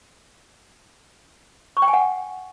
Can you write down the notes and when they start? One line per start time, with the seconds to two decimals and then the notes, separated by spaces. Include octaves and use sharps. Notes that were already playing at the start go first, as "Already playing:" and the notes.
1.77 C#6
1.82 G5
1.88 G#5
1.93 F#5